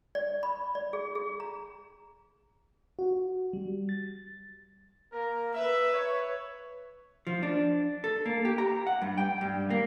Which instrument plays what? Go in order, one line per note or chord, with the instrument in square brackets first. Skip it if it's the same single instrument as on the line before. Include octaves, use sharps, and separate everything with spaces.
[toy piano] D5
B5
D5
G#4
G#4
A#5
[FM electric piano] F#4
G3
A6
[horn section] A#3 A#4
[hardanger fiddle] B4 [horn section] E5
[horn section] C#5
[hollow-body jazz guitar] F3
D4
A4
A#3
G4
A#5
F#5
G2
G5
G2
A#3